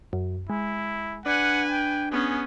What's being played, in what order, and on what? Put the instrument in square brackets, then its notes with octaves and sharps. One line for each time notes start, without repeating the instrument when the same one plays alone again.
[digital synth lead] F#2
[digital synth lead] G#3 [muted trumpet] E4
[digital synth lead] D4 [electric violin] B4 G#5 [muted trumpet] F#5
[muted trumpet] G5
[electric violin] B3 C#4 [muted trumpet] G#4